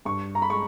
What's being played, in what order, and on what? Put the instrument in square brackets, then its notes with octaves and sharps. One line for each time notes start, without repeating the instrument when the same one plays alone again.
[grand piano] G2 C#6
A#5
B5
G#3 C#6